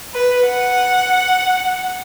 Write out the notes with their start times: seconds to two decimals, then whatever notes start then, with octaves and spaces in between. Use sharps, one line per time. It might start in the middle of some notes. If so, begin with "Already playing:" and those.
0.14 B4
0.47 F#5